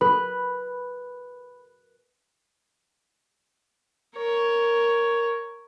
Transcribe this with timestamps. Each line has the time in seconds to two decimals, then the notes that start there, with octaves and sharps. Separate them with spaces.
0.01 B4 B5
4.16 A#4 C#5